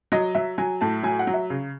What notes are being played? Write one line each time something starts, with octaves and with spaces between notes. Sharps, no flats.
F#3 D#5
F#3 E5
F#3 G#5
A2 A5
F#3 G#5
F#5
F#3
E5
C#3